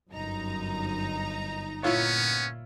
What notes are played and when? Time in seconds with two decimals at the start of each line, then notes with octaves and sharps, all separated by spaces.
0.11 G1 F#2 D#4 A#5
1.83 A#2 B3 C#4 E4 F4 C#5